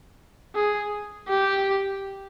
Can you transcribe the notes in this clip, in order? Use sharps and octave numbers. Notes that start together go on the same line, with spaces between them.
G#4
G4